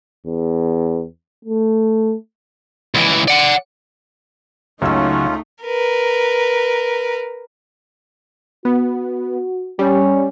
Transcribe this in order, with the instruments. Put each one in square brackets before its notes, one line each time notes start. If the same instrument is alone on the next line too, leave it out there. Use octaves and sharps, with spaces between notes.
[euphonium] E2
A3
[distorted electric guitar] C#2 E3
D5 F#5
[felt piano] C#2 E6 [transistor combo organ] C#3 F#3 [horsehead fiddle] A3 D#4 [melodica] C#4 F4
[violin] A#4 B4
[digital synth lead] B3 [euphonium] F#4
[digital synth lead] G3 [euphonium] C#4